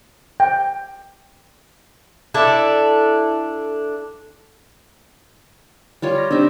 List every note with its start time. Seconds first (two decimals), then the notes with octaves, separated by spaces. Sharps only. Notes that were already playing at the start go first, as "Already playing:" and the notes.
0.40 G5
2.34 D4 E4 A4
6.02 G3 F4 C#5
6.18 A#6
6.31 C4 D4 D#4 G4 E5